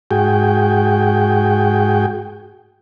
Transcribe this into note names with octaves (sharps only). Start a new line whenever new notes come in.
G#2 F#4 G#4 G5